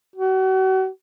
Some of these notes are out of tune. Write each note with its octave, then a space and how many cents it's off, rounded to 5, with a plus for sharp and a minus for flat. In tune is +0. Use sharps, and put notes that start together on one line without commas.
F#4 +35